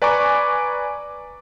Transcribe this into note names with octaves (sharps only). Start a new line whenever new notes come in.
B4 D5 G#5 A#5 C#6 D6